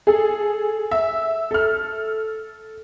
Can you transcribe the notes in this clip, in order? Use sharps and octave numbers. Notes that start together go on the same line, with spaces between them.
G#4 A4
E5
A4 F6